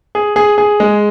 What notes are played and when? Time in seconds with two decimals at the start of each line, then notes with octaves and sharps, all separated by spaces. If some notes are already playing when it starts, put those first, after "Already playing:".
0.15 G#4
0.36 G#4
0.58 G#4
0.80 G#3